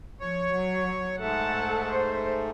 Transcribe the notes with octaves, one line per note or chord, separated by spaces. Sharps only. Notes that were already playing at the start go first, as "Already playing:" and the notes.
F3 C#5
F#3
G#2 A3 A4 F#5 A5
C5